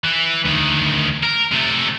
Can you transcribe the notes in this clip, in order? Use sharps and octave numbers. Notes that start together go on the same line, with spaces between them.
E3
D2 D#3
A#4
C3 A3